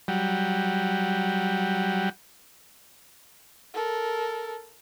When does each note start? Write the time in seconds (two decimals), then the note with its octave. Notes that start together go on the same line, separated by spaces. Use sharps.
0.08 F#3 G3
3.74 A4 A#4